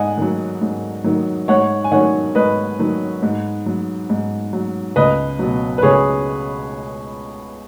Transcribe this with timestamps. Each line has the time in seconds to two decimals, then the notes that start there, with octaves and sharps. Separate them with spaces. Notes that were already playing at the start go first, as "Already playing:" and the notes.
Already playing: G#2 D#5 F#5 G#5
0.18 D#3 F#3
0.61 G#2
1.04 D#3 F#3
1.48 G#2 C#5 F#5
1.84 G#5
1.91 D#3 F#3 C#5 F#5
2.35 G#2 B4 D#5
2.79 D#3 F#3
3.22 G#2
3.66 F#3
4.10 G#2
4.53 F#3
4.96 C#2 B4 D#5
5.39 B2 F#3
5.78 B4
5.83 C#2 G#4 C#5